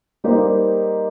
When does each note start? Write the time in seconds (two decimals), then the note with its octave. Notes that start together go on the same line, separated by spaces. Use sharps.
0.24 G3 A#3 D#4 G4 C5